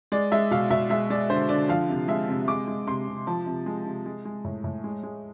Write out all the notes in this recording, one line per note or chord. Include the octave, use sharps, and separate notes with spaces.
G#3 D5
G#3 E5
B2 F5
B2 E5
G#3 E5
G#3 D5
D3 C5
D3 D5
F3 F5
C3
G#3 E5
C3
G#3 D6
G#3
C3 C6
C3
F3 A5
C3
G#3
C3
G#3
G#3
A2
A2
G#3
G#3